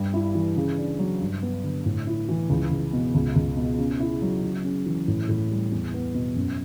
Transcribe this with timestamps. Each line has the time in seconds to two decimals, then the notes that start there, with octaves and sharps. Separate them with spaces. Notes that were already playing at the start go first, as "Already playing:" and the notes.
Already playing: G2 G3
0.14 E4
0.35 E3
0.56 C#3
0.78 D4
0.99 F#3
1.21 G2
1.43 B3
1.64 D3
1.86 A2
2.07 E4
2.29 E3
2.50 C#2
2.71 C#2
2.93 B2
3.14 C#2
3.36 C#2
3.57 B2
3.78 C#3
4.00 E4
4.22 F#3
4.43 C#3
4.64 C#4
4.86 E3
5.08 A2
5.29 A2
5.51 G3
5.72 E2
5.94 B3
6.15 B2
6.36 F#2